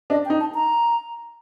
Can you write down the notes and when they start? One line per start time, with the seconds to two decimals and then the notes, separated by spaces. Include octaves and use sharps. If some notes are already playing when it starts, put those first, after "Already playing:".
0.10 D4 D#5
0.25 G5
0.30 D#4
0.40 A5
0.55 A#5